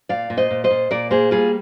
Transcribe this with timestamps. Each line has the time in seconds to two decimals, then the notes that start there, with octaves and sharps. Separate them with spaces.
0.09 A#2 D5 F5
0.30 A#2
0.37 C5 D#5
0.51 A#2
0.64 C5 D#5
0.71 A#2
0.91 A#2 A#4 D5
1.11 A#3 G#4 C5
1.31 G3 F4 G#4